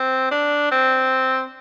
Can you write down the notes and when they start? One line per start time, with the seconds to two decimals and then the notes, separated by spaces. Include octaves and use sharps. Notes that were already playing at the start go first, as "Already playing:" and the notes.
Already playing: C4
0.31 D4
0.71 C4